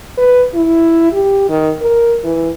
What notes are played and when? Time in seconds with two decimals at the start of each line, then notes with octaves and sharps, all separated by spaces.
0.18 B4
0.54 E4
1.13 G4
1.49 D#3
1.82 A#4
2.24 E3